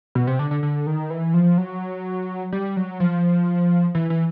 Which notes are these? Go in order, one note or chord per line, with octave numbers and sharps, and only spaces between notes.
B2
C3
D3
D3
D3
D#3
E3
F3
F#3
G3
F#3
F3
E3
E3